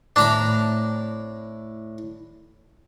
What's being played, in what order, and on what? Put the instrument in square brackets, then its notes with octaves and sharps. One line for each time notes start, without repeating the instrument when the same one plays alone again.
[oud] A2 C4 E4 [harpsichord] D4 A#5 B5